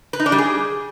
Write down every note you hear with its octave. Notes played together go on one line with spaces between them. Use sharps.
B4
D#4
D4
G3
G#4